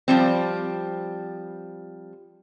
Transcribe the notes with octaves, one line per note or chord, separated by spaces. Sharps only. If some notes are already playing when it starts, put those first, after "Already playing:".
F3 G3 C4